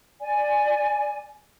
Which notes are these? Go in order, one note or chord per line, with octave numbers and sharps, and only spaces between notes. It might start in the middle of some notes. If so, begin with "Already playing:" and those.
D5 G#5